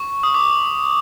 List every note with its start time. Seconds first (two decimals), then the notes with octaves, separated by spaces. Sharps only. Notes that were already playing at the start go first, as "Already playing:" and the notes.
Already playing: C#6
0.23 D#6
0.34 D6